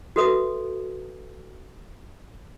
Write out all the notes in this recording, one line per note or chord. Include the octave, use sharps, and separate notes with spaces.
F#4 A4 B4 E5 D#6